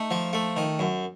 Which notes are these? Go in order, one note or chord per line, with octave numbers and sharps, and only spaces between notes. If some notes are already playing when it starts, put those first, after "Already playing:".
Already playing: A3 D#4
F3
A3
D#3
F#2